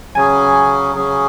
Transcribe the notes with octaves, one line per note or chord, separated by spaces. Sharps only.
C#3 F#3 C#4 G#4 G#5
C#3 F#3 C#4 G#4